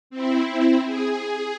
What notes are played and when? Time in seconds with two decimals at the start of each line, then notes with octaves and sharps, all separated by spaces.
0.10 C4 E4
0.86 G#4